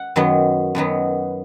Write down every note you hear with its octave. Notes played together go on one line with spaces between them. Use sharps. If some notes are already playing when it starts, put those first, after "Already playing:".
Already playing: F#5
F#2 D#3 F#3 B3
F#2 D#3 F#3 B3